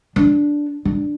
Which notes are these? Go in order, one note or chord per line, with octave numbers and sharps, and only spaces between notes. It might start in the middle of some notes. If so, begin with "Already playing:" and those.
D4
D4